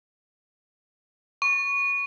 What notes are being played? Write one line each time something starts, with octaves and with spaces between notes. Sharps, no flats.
C#6